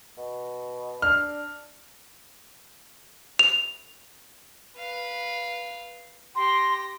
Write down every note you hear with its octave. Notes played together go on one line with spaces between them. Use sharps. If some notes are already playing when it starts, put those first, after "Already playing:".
B2
D4 F6
F7
B4 F5
G4 C6 A#6